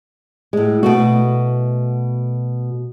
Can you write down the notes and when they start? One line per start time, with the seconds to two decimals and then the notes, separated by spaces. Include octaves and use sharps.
0.53 A2 G#3
0.83 B2 A3 F#4